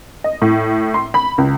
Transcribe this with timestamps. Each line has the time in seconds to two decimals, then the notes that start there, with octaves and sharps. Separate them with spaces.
0.24 D#5
0.42 A2
0.94 C6
1.14 B5
1.38 C#2